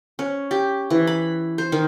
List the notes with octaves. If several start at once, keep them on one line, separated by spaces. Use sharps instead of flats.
C#4
G4
E3
B5
C5
D#3